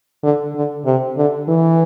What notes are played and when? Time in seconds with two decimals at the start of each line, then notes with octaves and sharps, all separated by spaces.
0.23 D3
0.55 D3
0.85 C3
1.17 D3
1.48 E3